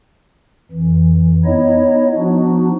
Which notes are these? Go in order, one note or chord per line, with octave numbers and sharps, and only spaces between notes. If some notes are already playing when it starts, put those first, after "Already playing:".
F2 E3
B3 D#4 E4 C#5 D#5
F3 B3 D4 D#4 F#4